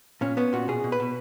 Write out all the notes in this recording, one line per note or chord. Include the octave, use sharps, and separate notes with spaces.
A#2 C#4
B3 C#4
A#2 F#4
B2 G#4
B2
B4
B2